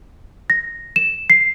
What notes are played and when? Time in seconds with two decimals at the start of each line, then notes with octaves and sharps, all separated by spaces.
0.50 A#6
0.96 E7
1.30 C7